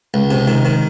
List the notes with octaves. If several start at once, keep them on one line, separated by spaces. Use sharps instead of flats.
C#2
C3
D#3
D#3